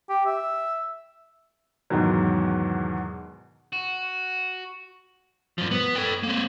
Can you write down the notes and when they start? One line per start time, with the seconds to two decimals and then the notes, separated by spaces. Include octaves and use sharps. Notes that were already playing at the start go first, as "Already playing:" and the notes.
0.09 G4
0.26 E5
1.90 E2 G#2 B2 D#3 F#3
3.73 F#4
5.58 G2 F3
5.71 B3
5.96 A4 G5
6.23 A#3 C4